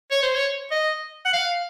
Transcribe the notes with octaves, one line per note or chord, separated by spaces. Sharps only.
C#5
C5
C#5
D#5
F#5
F5